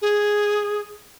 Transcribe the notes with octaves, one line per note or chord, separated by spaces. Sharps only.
G#4